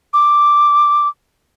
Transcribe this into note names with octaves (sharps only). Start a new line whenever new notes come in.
D6